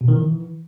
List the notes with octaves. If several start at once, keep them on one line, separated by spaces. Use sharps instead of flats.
B2
D#3
E3